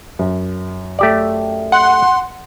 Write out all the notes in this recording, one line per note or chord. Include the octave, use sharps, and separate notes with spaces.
F#2
A3 G4 D5
F#5 C6